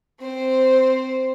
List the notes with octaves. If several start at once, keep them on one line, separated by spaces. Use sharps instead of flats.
C4 C5